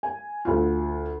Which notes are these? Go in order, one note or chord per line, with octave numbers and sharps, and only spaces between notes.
G#5
D2 F4